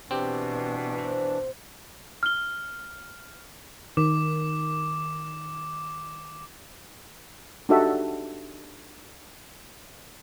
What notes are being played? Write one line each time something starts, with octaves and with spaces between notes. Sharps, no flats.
B2 E3 C4 D4 G4
C4
F6 G7
D#3 D6
D4 D#4 F#4 G4 A4 E5